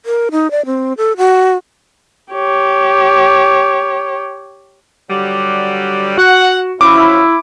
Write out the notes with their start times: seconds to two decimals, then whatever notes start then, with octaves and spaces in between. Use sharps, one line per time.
0.06 A#4
0.32 D#4
0.51 D5
0.66 C4
0.97 A4
1.18 F#4
2.33 G4 C#5
5.10 D3 F#3 G3
6.18 F#4 F#5
6.81 F3 F#3 C#4 E4 D6